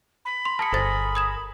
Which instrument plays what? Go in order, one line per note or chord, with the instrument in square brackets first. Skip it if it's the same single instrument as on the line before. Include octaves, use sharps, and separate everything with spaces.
[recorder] B5
[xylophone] C6
[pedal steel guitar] G#4 A#4 [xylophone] A5 C#7
[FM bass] G1 [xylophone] A4 C5 A6
[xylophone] D#6 G#6 E7